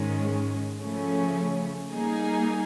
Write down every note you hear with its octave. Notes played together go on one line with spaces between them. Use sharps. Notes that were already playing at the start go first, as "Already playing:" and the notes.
Already playing: G#2 D#3 G#3 C#4
C#3 F3 A3 C#4
G3 A#3 D#4 G#4